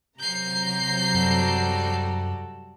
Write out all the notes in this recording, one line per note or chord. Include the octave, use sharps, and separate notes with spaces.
C3 F#3 A#5 G6 C7
F#2 G3 F#4 A4